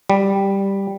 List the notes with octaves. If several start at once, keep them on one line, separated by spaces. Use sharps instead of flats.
G3